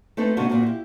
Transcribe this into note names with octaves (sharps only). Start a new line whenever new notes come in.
A3 C4 D#4 A4 B4 C5
G#2 C3 D#3 A#3 D4 F#4
A#2 A#3 C4 F#4
E4 G4